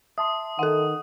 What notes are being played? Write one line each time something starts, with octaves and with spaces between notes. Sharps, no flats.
E5 A5 C6 D#6
D#3 A4 F#5